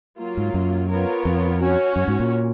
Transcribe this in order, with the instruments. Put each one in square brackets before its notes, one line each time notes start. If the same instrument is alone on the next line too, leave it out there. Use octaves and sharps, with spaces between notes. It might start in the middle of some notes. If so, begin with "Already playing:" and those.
[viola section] F#3 A#3 F4
[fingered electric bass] G#2
F#2
[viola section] B3 F4 A#4 C#5
[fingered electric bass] F2
[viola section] C#4 F#4 C#5
[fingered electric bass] F#2
G#2
A#2